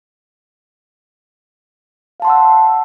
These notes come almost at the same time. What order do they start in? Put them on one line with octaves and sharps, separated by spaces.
F5 A5 C6 F#5 E6